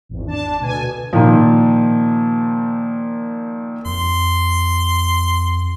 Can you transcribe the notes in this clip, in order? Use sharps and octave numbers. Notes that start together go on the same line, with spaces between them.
G#1 E2
D4 A5
D2 B2 G#5
A#2 D#3 F3
F2 C6